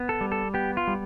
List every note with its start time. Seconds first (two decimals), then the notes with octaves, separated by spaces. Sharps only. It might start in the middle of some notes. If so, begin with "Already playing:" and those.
Already playing: B3
0.09 A4
0.21 G3
0.32 A4
0.54 B3 G4
0.77 F4
0.87 G3